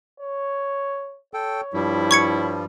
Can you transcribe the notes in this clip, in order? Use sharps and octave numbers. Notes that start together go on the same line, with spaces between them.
C#5
A4 C#5 G5
G2 F3 G3 E4
C#6 G#6 C#7